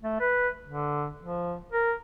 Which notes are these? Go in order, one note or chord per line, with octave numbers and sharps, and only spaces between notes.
A3
B4
D3
F3
A#4